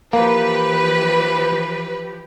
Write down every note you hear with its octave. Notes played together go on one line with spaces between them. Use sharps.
E3 F3 A#3 G4 B4